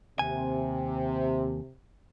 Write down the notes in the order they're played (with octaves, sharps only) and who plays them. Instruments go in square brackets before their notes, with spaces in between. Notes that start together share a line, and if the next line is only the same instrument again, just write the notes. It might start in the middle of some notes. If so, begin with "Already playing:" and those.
[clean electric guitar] D#2 G#5 [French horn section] C3